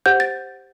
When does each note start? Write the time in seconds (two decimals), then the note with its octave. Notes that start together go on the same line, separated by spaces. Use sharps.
0.06 G4 C5 F#5 G6
0.20 A6